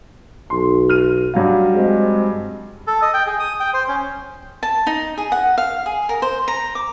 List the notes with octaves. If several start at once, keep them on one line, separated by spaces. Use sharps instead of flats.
B1 C6
F6 D#7
G2 F#3 F5
G#3 C4
A4
D#5
G5
G#4
D#6
G5
C5
C#4
A5
D#4
G#4
F#5
F5
G#4
A#4
C5
A#5
D6